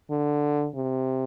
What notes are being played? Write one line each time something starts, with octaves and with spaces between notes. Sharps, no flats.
D3
C3